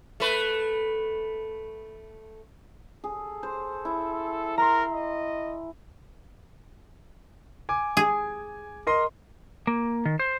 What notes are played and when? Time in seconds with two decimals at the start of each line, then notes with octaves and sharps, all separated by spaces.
0.20 A3 B4
3.04 G#4 A4
3.43 C5
3.85 E4
4.58 A#4 A#5 C6
4.92 D#5
7.69 G#5 D6
7.97 G#4
8.87 A#4 D#5 C6
9.67 A#3
10.05 D#3
10.19 C5